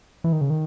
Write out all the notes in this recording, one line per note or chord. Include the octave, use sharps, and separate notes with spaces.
E3
D#3
C#3
D#3